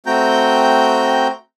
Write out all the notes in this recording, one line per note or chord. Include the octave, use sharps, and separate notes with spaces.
A3 C4 F#4 G5 A#5 G6